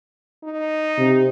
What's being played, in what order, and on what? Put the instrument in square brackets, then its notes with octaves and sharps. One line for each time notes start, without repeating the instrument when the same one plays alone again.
[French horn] D#4
[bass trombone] C3